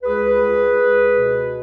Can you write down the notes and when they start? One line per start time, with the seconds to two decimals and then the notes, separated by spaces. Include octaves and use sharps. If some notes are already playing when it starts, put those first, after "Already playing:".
0.03 C#2 G#4 B4
0.40 C#2
0.76 C#2
1.14 B2